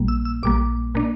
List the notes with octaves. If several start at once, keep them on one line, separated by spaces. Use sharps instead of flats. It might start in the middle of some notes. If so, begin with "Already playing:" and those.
Already playing: A#1 A#2 G3 A#3
E6
E6
A#1 A#2 G3 A#3 D6
A#2 A#3 D4